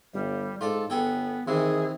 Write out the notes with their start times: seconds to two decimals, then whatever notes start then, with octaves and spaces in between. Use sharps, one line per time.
0.14 G1 G3
0.61 G#2 F4 A4 D5
0.90 G1 B3 G#4 A4 G5
1.48 C3 D#3 E3 G#4